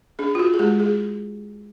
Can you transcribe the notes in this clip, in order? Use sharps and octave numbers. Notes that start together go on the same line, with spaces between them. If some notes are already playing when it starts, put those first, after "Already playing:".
D4 G#4
F4
F#4
G#4
G#3 G4
G#4